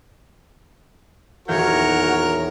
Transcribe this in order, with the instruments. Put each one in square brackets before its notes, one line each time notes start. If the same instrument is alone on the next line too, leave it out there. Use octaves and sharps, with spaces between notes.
[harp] D#1 E2 G6 [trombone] F#4 [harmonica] A#4 C#5